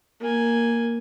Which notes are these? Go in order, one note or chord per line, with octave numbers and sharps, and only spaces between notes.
A#3 G#5